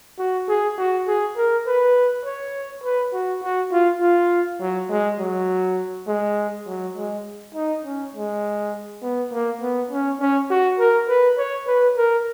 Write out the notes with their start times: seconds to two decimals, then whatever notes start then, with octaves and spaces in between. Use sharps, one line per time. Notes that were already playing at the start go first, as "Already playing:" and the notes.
0.19 F#4
0.49 G#4
0.78 F#4
1.07 G#4
1.36 A#4
1.67 B4
2.25 C#5
2.84 B4
3.13 F#4
3.43 F#4
3.72 F4
4.01 F4
4.61 F#3
4.89 G#3
5.20 F#3
6.08 G#3
6.67 F#3
6.96 G#3
7.55 D#4
7.85 C#4
8.14 G#3
9.02 B3
9.32 A#3
9.61 B3
9.91 C#4
10.20 C#4
10.50 F#4
10.79 A#4
11.09 B4
11.38 C#5
11.67 B4
11.97 A#4